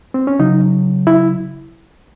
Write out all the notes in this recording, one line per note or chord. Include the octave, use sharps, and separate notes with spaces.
C4
C#4
C#3 F#3 D#4
E4